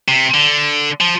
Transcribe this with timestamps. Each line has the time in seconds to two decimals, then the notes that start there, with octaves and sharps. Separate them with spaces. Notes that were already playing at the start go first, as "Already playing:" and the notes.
0.08 C3
0.34 D3
1.01 F3